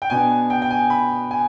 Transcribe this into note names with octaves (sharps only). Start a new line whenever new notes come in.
G5
B2 B3 D4 G#5
G5
G5
G#5
B5
G#5